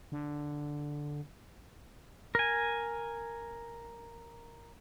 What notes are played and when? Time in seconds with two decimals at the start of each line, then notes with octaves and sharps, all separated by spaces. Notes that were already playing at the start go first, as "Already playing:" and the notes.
0.12 D3
2.35 A#4 G#5